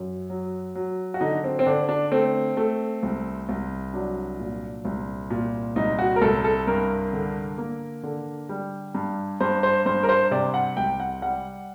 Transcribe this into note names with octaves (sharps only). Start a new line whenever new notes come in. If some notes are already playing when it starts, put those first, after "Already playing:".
Already playing: F#2
F#3
F#3
F#4
D3 D#4
C4
C4
D3 D4
D4
A3 C4
A3
C2
C2
F#3 D4
A#2
C2
A#2
C2 D#4
F#4
A#4
C2 A4
A4
G2 A#4
D3
A#3
D3
G3
G2
G2 C5
C5
G2 C5
A#4
C5
C3 D5
F#5
C2 G5
F#5
G3 F#5